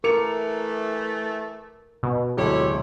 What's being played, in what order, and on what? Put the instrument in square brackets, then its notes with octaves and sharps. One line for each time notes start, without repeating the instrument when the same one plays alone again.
[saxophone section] E3 A3 [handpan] A#4 [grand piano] D6 C#7 F7
[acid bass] B2
[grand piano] D1 G#3 A4 [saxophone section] E4 G4 C#5